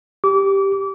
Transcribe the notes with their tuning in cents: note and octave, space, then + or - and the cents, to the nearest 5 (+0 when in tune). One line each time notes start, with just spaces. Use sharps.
G4 +0 D6 -30